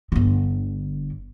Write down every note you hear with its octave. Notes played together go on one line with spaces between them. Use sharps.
G1 D3